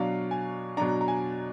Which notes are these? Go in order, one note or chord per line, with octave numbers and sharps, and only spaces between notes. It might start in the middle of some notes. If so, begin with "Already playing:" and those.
Already playing: B2 F#3 D4 F5
G#5
B2 F#3 D4 A#5
A#5
G#5